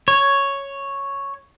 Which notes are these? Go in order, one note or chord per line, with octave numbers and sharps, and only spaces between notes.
C#5